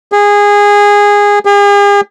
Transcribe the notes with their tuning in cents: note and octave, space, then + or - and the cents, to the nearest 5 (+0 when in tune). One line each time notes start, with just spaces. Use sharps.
G#4 -20
G#4 -45